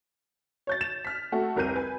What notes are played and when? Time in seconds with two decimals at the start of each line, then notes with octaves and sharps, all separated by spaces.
0.67 C#5 G6 A6
0.81 E7
1.05 F6 B6
1.32 A3 F#4 A4
1.56 F1 C2 A#4 A#5 G6 D#7
1.75 B4 G#5